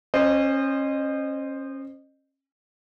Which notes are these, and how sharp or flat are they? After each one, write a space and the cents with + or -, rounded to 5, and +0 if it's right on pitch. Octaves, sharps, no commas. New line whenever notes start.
C#4 -30 C5 +0 D#5 -30